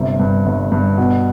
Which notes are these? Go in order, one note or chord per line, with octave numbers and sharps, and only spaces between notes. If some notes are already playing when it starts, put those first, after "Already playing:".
Already playing: G1 C3
G2
G1
G2
B2